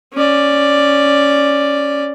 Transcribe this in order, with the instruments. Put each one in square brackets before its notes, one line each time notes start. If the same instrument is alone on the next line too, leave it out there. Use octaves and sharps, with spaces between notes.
[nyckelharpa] C#4 D5